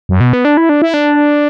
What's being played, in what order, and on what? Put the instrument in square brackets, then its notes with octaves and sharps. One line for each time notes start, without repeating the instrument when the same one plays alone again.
[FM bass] F#2
B2
B3
D4
E4
D4
E4
D4